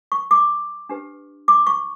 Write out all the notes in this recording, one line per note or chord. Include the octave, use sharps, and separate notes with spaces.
C#6
D6
D4 G4 B4
D6
C#6